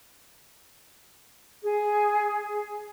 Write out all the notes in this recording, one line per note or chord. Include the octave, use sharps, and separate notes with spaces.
G#4